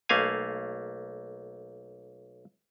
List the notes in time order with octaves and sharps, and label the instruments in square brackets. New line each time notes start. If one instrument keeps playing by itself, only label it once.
[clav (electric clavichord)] B1 A3 A#3 F5 G#5